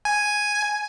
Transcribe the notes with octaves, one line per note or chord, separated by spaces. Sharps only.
G#5